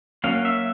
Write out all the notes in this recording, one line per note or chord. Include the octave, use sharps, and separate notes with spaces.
F#3 A#3 C#4 F5
E5